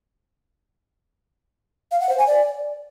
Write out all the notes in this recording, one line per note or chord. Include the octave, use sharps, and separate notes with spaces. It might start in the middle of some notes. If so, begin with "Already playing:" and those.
F5
F#5
C5
G#5
D5